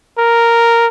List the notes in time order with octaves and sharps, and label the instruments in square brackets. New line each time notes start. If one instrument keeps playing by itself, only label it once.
[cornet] A#4